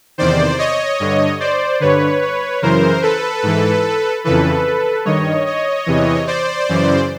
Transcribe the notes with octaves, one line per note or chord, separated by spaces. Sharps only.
E2 C3 D#3 C5 D5
C#5 D#5
G2 D3
C5 D5
G2 D3 B4 C#5
B4 C#5
F#2 C#3 E3 A#4 C5
A4 B4
G#2 E3
F2 C#3 E3 A4 B4
G2 D#3 C#5 D#5
C#5 D#5
E2 C3 E3
C5 D5
F#2 C#3 E3